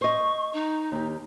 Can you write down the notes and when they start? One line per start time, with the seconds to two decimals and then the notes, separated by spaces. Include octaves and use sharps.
0.01 C5 D#5 C#6
0.53 D#4
0.92 D#2 G4